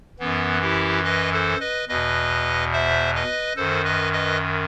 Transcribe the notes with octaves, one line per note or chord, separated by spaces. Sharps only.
F#2 E3 B3
E4 G4
B4 D#5
A4 C5
B4 D#5
E2 B2 B4 D#5
C5 E5
B4 D#5
F#2 D#3 A4 C5
B4 D#5
B4 D#5